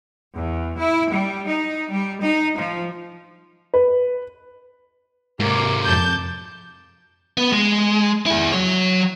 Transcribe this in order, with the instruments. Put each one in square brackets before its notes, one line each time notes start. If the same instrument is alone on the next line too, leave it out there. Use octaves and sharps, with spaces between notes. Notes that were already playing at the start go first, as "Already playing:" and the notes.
[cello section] E2
E4
G3
D#4
G3
D#4
F3
[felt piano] B4
[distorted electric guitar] G#2 C3 [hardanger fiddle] A#3 D6
[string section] F2 G6 [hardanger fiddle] A5 D6
[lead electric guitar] B3
G#3
E4 G#4
F#3 C#5